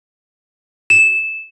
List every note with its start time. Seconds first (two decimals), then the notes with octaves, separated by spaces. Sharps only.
0.90 E7